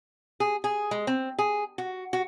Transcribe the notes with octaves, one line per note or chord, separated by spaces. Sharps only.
G#4
G#4
G#3
C4
G#4
F#4
F#4